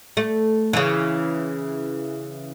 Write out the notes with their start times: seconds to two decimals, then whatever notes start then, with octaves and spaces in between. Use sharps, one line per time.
0.17 A3
0.73 C#3 E3